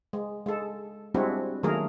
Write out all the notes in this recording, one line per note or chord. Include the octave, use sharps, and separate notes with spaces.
G#3
G#3 A4
G3 G#3 C4 D4 E4 F#4
D#3 F#3 A3 A#3 G#4 A#4